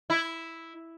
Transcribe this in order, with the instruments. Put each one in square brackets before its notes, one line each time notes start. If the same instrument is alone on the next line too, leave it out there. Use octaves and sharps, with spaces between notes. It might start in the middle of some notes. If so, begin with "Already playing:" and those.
[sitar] E4